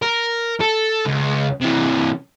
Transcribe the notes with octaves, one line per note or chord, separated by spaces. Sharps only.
A#4
A4
C#2
C3 E3